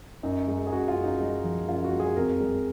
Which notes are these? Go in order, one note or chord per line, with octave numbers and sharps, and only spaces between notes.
F#2 D#4
G#3
G#4
F#2 F#4
F4
F#2
D#4
G#3 D#4
F3
F#2 F4
F#4
G#3
G#4
F2 A#4
G#3